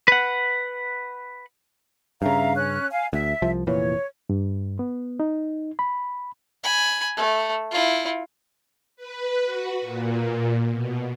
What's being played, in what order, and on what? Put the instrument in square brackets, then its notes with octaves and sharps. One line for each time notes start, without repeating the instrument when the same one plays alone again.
[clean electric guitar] B4 F#5
[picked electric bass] G2 C#3 [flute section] E5 F5 A#5
[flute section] C#4 F#6
F5 G#5
[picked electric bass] D2 [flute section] E5
[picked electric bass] C2 F3
[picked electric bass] F1 A#2 E3 [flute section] C#5
[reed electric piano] G2
B3
D#4
B5
[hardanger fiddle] G#5 B5
A3
E4 F4
[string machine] B4
F#4
A#2
B2